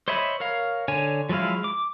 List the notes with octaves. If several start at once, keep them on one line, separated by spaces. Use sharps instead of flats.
C5 C#5 D#5 E5 B5
A#4 C#5 F5
D3 C#5 G#5
F3 F#3 G#3 E4 F5
D6